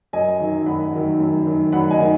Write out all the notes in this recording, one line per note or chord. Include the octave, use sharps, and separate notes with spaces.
F#2 D#5 G#5
D#3 F#3
F#2 F#5 B5
D#3 F#3
F#2
D#3 F#3
F#2 F#5 B5
D#5 G#5
D#3